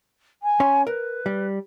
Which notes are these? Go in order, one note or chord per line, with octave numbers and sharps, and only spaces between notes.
G#5
C#4 C#5 C6
A#4 B4
G3